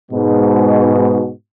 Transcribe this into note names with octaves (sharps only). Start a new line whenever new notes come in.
G#2 B2